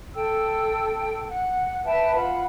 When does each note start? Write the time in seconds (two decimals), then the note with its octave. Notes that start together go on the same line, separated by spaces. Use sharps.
0.15 A4 G5 E6
1.29 F#5
1.85 B4 E5 G5 A5
2.15 F4 F#5 B5